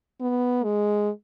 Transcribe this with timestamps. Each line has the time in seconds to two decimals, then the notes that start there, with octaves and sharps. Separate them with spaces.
0.21 B3
0.64 G#3